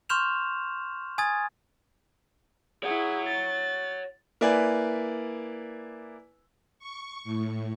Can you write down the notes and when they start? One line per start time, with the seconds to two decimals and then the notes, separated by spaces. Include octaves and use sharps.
0.09 C6 C#6 F6 G6 E7 F7
1.18 G#5 D#6 G#6 A6
2.83 E4 G#4 C#5 F#5
3.28 A6
4.41 A#3 E4 B4 D5 G#5
6.79 C#6
7.24 A2